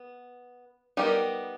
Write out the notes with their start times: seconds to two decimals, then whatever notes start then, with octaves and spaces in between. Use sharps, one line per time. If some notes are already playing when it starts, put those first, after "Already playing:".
Already playing: B3
0.97 G3 B3 D#4 G4 A#4